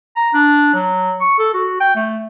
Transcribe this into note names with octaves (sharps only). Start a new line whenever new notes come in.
A#5
D4
F#3
C#6
A4
F#4
G5
A3